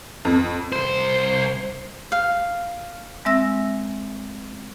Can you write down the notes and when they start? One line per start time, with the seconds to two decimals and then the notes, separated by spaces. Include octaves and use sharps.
0.25 F2
0.72 C2 C5
2.12 F5
3.25 G#3 C4 E5 E6 A#6